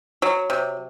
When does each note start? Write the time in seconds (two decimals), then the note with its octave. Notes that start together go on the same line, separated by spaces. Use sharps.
0.22 F#3
0.50 C3